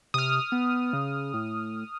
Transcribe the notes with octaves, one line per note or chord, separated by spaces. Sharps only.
C3 D#6 F6
B3
C#3
A2